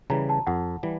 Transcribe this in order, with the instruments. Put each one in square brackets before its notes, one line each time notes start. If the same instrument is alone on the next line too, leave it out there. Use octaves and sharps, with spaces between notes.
[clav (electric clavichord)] C#3 E3 G3 [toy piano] A#5
[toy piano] A5
[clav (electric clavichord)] F2 [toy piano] F#5
[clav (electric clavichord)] E3 G3